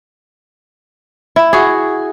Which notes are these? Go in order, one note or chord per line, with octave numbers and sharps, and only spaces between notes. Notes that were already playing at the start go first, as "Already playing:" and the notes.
E4
F#4 G#4